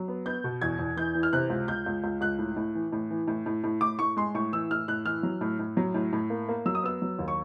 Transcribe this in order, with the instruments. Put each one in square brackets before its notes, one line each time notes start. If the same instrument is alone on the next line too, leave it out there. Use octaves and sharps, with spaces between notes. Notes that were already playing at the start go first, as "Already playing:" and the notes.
Already playing: [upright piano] F#3
B3
B3 G6
B2
E2 G#6
E2
E3 G6
E3
F6
C3 F#6
C#2
C#2 G6
C#2
C#2
C#2 F#6
A2
A2
E3
A2
E3
A2
A2
A2
A2 D6
A2 C#6
G#3 C6
A2 C#6
E3 E6
A2 F6
A2 F#6
E3 F6
F#3
A2
A2
F#3
A2
A2
A#3
A#3
F#3 E6
D#6
B3 E6
F#3
D#2
C#6